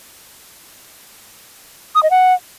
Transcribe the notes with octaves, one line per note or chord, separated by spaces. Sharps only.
D#6
D#5
F#5